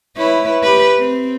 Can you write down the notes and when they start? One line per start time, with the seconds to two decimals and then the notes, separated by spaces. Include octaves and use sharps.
0.17 E4 B4 C#5
0.63 G4 B4
0.99 C4